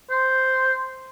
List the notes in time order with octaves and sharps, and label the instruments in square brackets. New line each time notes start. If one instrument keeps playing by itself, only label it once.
[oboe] C5